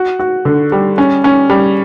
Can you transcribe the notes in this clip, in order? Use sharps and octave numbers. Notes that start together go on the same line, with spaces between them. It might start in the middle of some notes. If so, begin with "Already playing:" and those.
Already playing: F#4
F#4
D3
G3
C#4
C#4
G3